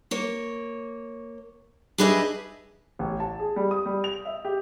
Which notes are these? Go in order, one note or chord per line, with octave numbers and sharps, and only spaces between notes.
A#3 C#5
D4 G4 G#4 B4 D#5 E5
A1
A5
G#4
G3
D#6
G3
F7
E5
G4